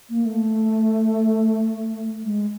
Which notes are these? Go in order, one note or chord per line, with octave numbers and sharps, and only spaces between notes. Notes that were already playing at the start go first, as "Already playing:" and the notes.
A#3
A3
G#3